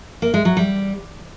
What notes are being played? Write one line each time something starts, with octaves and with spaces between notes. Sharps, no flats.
A#3
G#3
F#3
G3